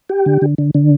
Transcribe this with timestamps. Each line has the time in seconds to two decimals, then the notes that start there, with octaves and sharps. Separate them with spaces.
0.10 G4
0.26 D3
0.42 D3
0.58 D3
0.75 D3